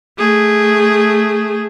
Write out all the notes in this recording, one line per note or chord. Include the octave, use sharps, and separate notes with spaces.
A3 G#4